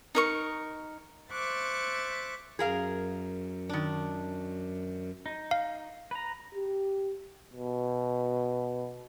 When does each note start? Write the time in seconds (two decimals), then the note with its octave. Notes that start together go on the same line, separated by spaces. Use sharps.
0.15 D#4 A#4 C#6
1.31 C5 E5 C#6 D6 F#6 A6
2.59 F#2 G#4 A#4 F5
3.69 D#3 D4
5.26 D#4
5.51 F5
6.11 B4 A#5
6.54 G4
7.53 B2